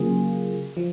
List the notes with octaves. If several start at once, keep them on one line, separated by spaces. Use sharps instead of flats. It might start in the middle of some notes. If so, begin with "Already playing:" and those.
Already playing: C#3 F#3 A#3 F4 G#4
F3